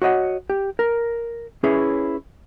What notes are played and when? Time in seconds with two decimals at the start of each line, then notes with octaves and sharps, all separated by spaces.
0.02 F#4 C#5 D#5 F#5
0.50 G4
0.79 A#4
1.64 C#4 E4 G#4 B4 C#5